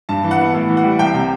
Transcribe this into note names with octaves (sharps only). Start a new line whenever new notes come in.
G2 A5
E3
F#5
B3
A2
E3
F#5
G3
C2 G5
C3